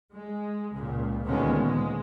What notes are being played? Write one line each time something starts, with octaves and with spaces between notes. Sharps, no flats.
G#3
C#2 A#2
D2 A#2 D#3 G#3 B3 C#4
G#3